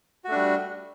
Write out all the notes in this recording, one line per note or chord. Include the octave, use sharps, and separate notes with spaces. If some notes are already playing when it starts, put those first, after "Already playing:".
G3 A3 D4 F#4